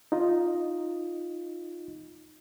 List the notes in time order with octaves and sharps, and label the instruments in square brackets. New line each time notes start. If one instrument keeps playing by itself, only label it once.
[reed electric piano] D#4 F4 D#5